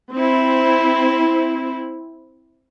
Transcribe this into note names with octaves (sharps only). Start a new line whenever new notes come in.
C4 E4